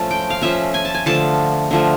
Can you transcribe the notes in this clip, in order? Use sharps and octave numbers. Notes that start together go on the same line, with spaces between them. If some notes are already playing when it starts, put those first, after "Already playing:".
Already playing: F3 A3 C#4 A5
G5
F5
F3 A3 C#4 E5
G#5
A5
G#5
D3 F3 A3 A5
D3 F3 A3